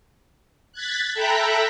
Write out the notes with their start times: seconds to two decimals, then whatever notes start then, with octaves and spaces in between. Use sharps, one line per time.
0.72 F#6 G#6 A6 B6
1.14 A4 E5 G5 A#5 B5 F#6